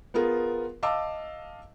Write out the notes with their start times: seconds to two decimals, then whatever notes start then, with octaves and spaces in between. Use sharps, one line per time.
0.14 B3 F4 G#4 A#4
0.83 D#5 F5 A5 D6 E6